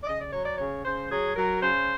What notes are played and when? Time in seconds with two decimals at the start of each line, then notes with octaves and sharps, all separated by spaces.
0.02 D5
0.07 C#3 D#5
0.20 D5
0.32 F#3 C#5
0.46 D5
0.58 C#3 C#5
0.84 C#3 C5
1.10 F#3 G#4
1.36 F#3 A#4
1.62 C#3 C5